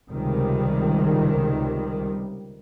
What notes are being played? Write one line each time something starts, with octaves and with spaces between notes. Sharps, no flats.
C#2 C3 D#3 G3